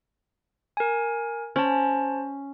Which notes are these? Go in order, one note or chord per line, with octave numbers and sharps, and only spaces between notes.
A#4 G#5
C#4 C5 A5